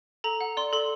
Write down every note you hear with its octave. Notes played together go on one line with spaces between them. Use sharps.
A4 A#5
F#5
D5 C6
A4 C6